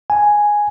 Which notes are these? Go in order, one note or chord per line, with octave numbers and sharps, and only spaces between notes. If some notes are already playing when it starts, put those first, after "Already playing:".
G#5